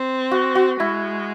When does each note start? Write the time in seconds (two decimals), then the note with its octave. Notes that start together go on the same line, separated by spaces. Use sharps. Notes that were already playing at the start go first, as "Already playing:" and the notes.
Already playing: C4
0.31 F#4
0.55 F#4
0.80 G#3 E4